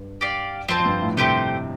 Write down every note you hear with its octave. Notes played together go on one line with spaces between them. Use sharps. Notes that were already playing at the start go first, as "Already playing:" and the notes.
Already playing: G2
G4 D5 F5
F2 C4 F4 C5 A5
F2
G2
A2
C3 A3 C4 G4 C5